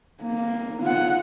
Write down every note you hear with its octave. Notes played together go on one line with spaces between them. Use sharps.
A#3
F4 F#5